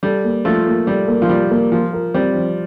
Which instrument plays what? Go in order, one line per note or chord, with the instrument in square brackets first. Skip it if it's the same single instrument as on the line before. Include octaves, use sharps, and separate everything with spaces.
[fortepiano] G3 [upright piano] A4
[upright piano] A#3
[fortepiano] F3 A3 [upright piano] F4
[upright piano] A#3
[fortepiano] G3 [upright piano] A4
[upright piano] A#3
[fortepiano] F3
[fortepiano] G3 [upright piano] F4
[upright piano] A#3
[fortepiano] F3 [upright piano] F4
[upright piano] A#4
[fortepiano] G3 [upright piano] C4
[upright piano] F3